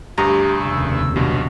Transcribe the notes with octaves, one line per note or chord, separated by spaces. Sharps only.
D2 G2 G4 A#5 D#6
F1 D#2 C#3 E6
B1 G2 B2 F#4